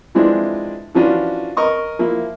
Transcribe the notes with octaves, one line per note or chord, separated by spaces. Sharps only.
E3 F3 G#3 C4 D4 E4
E3 F3 C#4 D4 F4 F#4
A#4 D#5 C#6 D#6
F3 A#3 E4